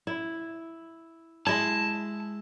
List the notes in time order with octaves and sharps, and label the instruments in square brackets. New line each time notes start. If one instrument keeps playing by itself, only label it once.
[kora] E4
[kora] G#3 E4 [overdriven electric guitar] A5